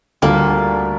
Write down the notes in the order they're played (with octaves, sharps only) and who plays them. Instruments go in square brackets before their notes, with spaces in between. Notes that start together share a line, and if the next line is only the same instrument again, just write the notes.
[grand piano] D2 D3 G3 D4 F4 [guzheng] A#3